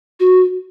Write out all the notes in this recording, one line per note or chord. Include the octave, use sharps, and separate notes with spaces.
F#4